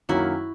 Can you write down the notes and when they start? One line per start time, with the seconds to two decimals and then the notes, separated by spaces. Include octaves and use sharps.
0.09 F#2 D#3 F#3 A#3 C#4 E4 F#4